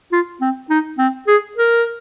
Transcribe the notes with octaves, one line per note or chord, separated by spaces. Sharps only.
F4
C4
D#4
C4
G#4
A#4